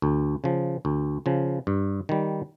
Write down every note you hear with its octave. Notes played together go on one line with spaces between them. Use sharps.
D2
C#3 F3
D2
C#3 F3
G2
D#3 G3